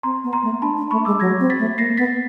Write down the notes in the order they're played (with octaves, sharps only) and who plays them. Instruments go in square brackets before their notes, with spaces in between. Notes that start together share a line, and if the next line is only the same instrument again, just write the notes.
[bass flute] C4 [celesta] A#5 C6
[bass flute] B3
[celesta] A#5 C6
[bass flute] A3
[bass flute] D4 [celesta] A5 B5
[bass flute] D4
[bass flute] A3 [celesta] B5 C#6
[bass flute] G#3 [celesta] D6 E6
[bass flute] F#3 [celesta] G#6 A#6
[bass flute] C4
[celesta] A6 B6
[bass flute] A3
[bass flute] A#3 [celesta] A#6 C7
[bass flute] B3 [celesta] A6 B6